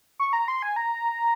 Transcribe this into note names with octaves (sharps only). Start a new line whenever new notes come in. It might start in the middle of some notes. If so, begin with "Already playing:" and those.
C#6
A#5
C6
G#5
A#5